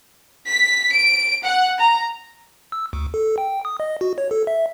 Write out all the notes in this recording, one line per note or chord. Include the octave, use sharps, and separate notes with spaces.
B6
D7
F#5
A#5
E6
D2
A4
G5
D#6
D#5
F#4
C#5
A4
E5